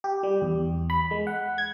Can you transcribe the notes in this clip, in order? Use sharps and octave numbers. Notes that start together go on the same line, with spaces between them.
G4
G3
E2
B5
G#3
F#5
G#6